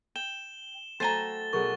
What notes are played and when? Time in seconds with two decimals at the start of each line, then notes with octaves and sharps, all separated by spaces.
0.16 G5 E7 G7
1.00 A3 F#4 C5 G5 G#5 A#5 A6 G7
1.53 B1 G#4 A#4 F#5 C#6